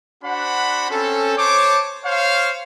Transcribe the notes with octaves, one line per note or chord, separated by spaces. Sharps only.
D4 F#4 C5 F#5 B5
C4 C#4 A4
C5 C#5 A5 D6
C5 C#5 F5